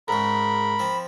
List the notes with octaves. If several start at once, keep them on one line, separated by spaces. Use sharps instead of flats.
G#2 C#3 A#4 B5
F3 C4